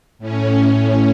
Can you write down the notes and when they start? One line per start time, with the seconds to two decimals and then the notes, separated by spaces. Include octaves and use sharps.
0.19 A2 C#4